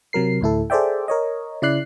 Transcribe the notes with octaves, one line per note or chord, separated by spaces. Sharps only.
C3 F#3 A#4 C7
D2 A2 E4 A4
G#4 A4 C5 D5 E5 G5
A#4 C#5 D#5
C#3 E4 D5 F#6 C7